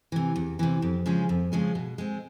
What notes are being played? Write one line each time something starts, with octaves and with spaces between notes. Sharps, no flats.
C3 E3
E2
C3 E3
F2
C#3 F3 G#3 C#4
F2
C#3 F3 G#3 C#4
B2
G#3 C4